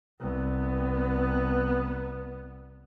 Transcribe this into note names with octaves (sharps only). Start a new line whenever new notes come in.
C2 B3